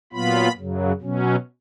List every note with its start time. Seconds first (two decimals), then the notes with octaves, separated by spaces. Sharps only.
0.13 A#2 F#3 B3 F4 B5
0.56 F#2 C#3 F#3
1.01 B2 F#3 C#4